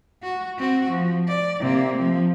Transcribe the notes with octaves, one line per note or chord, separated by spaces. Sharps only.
F#4
C4 F#4
F3
D5
C3 A#3
F3